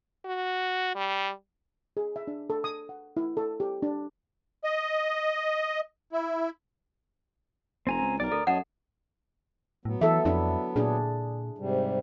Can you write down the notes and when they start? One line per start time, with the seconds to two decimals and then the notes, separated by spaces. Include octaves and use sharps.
0.25 F#4
0.95 G3
1.97 G#4
2.16 E5
2.27 D4
2.50 A4
2.64 D#6
2.89 F#5
3.17 E4
3.37 A4
3.60 G4
3.82 D4
4.64 D#5
6.13 E4
7.87 F1 C4 G#5 A#5
8.02 C#2
8.20 B1 A#4 D5
8.31 D2 A4
8.47 F#2 C#5 D#5 F#5 A5
9.85 A2 F#3 B3
10.01 E3 A4 E5
10.25 F2 D4 E4
10.76 A#2 D4 G#4
11.58 G#2 C3 G3